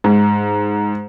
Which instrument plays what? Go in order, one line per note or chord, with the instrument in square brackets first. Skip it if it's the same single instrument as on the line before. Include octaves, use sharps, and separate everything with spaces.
[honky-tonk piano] G#2